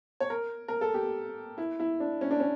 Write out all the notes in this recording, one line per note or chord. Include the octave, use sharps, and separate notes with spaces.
C#5
A#4
A#4
A4
G4
E4
E4
D4
C#4
D4
C#4